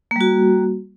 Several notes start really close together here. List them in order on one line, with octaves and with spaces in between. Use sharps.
A#3 G3 F#4